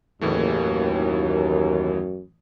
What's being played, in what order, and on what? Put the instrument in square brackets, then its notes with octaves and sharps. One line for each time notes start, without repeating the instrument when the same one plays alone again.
[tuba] F#1 [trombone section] D#2 [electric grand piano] A2 E3 A3
[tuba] F#2